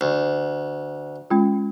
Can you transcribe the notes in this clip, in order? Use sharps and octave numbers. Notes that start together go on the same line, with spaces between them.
D2
G#3 C#4 F4